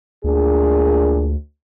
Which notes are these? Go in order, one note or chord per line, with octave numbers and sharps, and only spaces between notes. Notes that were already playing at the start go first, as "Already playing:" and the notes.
D2 A#2 D4 G#4